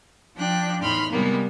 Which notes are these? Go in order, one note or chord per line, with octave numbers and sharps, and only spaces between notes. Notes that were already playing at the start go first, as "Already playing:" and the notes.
F3 D4 G5 F#6
E2 A2 D#4 B5 C6 F6
C3 G3 G#3 A#3 B3